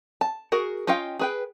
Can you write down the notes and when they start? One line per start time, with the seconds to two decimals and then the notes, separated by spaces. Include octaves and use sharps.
0.21 A5
0.52 F#4 G#4 A#4
0.87 C#4 F4 D#5 F5 G5
1.19 G#4 B4 G5